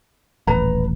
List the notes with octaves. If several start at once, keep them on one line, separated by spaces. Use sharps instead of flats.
D#1 A1 B4 A#5